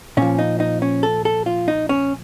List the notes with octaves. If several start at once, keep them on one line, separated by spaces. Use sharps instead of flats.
A#2 F3 C#4
D#4
D#4
C#4
A4
A4
F4
D#4
C#4